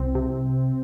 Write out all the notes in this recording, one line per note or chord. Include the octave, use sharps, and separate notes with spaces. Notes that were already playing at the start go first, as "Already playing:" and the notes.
Already playing: C2 C4
C3